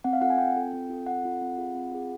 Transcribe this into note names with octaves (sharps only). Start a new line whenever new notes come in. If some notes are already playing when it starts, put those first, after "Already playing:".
C4 F#5
F5
F4 A4 F#5
G#5
C4 G5
F4 A4
C4
F4 A4
C4 F#5
F4 A4
C4
F4 G#4
C4
F4 G#4